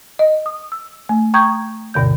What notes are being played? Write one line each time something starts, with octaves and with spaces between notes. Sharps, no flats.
D#5
D#6
E6
A3
G5 A#5 C#6 D#6 G6 G#6
D2 G2 B2 D3 G6